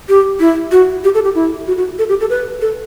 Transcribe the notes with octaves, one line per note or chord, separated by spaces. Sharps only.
G4
E4
F#4
G4
A4
G4
E4
F#4
F#4
A4
G4
A4
B4
A4